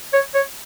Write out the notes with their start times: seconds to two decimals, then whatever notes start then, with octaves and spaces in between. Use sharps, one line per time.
0.13 C#5
0.34 C#5